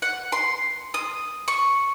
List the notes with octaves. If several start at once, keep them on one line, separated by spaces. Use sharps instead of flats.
F#5
C6
D#6
C#6